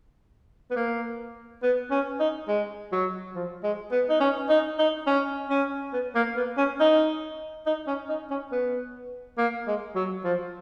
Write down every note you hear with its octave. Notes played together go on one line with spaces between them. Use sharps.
B3
A#3
B3
C#4
D#4
G#3
F#3
F3
G#3
B3
D#4
C#4
D#4
D#4
C#4
C#4
B3
A#3
B3
C#4
D#4
D#4
C#4
D#4
C#4
B3
A#3
G#3
F#3
F3